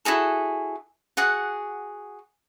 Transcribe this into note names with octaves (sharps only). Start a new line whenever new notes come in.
E4 F#4 G#4 A4
F#4 G#4 F#5